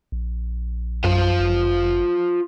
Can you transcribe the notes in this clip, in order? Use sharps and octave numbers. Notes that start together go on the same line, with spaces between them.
A#1
F#2 F4 C5 F5
G1